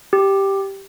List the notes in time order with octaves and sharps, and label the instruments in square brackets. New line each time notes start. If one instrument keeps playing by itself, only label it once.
[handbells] G4